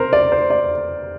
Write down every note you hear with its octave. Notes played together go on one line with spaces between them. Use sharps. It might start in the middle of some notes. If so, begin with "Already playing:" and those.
Already playing: C3 A#4 C5
D5
C5
D5